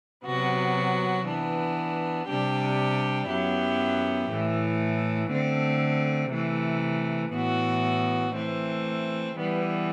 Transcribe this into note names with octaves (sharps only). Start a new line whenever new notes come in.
C3 F#3 B3 F#4
E3 B3 D4
C3 G3 D4 G4
F#2 F#3 B3 E4 G4
A2 E3 A3
D3 A3 C4
C3 E3 A3
A2 E3 B3 F#4
E3 A3 C4
E3 G3 B3